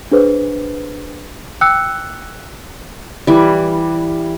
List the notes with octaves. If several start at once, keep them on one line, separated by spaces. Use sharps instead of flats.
D4 G#4 B4 C5
G5 D6 E6 F#6 C#7
E3 G3